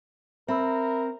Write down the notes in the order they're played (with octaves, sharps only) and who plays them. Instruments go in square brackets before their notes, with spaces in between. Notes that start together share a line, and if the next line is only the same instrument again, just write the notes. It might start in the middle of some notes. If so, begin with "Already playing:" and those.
[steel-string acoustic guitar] C4 [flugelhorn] A#4 [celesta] E5 B5 E6